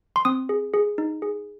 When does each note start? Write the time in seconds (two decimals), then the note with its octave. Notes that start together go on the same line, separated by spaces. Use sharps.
0.16 C6
0.25 C4 D#6
0.49 G#4
0.74 G#4
0.98 D#4
1.22 G#4